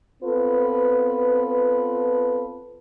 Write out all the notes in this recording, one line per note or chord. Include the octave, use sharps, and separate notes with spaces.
B3 C4 F4 A4 B4